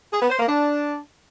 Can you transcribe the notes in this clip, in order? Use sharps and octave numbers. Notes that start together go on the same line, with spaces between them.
G#4
B3
C5
A#3
D4